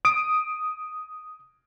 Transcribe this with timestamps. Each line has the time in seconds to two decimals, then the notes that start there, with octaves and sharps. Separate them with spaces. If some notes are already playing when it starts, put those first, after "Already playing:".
0.05 D#6 D7